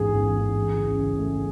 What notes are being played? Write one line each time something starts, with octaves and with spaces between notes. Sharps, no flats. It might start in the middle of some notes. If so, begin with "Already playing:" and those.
Already playing: A1 E2 G#2 G#4
A1
A1
E3
C#2
C#3
A3